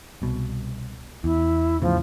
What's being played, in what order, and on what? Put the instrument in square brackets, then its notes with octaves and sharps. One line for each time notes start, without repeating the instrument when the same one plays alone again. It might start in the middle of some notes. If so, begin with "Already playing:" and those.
[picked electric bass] C2 B2
[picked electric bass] E2 [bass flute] E4
[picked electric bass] E2 A2 C#3 [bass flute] F3